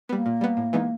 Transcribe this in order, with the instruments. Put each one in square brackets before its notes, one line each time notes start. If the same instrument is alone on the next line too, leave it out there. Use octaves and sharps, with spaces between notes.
[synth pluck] G3 B3 [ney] A#3
[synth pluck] A#2
G3 B3
A2
E3 G#3 B3 D#4